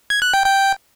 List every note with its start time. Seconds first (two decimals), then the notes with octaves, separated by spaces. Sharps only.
0.10 G#6
0.22 F#6
0.34 G5
0.45 G5